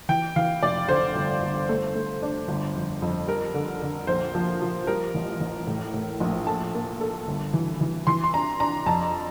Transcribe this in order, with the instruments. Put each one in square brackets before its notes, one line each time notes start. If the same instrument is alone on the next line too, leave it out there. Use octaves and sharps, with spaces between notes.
[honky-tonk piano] E3 [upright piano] G5
[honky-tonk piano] E3 [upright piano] F5
[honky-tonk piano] F1 [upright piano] D5
[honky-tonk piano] D3 [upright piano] C5
[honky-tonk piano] G1
G1
A3
A3
D4
G1
F2
F2
[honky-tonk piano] G3 [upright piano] A#4
[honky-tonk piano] D3
D3
[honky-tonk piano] A#1 [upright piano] C5
[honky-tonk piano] F3
F3
[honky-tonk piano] G3 [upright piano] A#4
[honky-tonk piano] A1
A1
A2
A2
A#1
[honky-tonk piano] A4 [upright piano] A5
[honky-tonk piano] A#3
A4
G1
E3
E3
[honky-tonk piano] E3 [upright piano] C6
[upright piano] C6
[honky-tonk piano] D4 [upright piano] A#5
[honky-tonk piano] D4 [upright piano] A#5
[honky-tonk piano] F2 [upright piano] A5